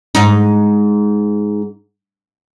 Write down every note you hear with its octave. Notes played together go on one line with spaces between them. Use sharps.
G#2 D#4